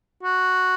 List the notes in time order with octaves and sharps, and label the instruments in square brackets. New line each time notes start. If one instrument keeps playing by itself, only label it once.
[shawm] F#4